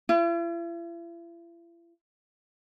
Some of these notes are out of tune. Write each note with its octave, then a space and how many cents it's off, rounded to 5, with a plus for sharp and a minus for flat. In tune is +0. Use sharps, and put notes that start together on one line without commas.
E4 +45